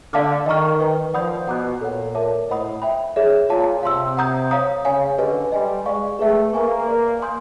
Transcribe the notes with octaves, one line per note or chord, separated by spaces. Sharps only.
D3 D5 F5 A5 D6 F6
D#3 D#5 G5 A#5 C#6 F6
B4 D#5 G5
F3 D5 F#5 B5 D#6 G6
B2 F#5 A#5 D6 F#6
A#2 A4 C#5 F#5
A#4 C#5 E5 A5 D6
A2 C5 D#5 F#5 B5 D#6
E5 G5 B5
G#4 C#5 E5
A#2 C#5 F5 A5
C3 F5 A5 C6 E6
F#5 A#5 D#6 G6
C#5 F5 A#5 D#6
C#3 C#5 F5 G#5
D3 G4 B4 D#5 G#5
G3 D#5 G#5 C6
G#3 D5 F5 G#5 C#6
A3 G#4 B4 E5 G5
A#3 B4 E5 G#5 C#6
A#4 D5 F5
F5 G#5 C6 D#6 G6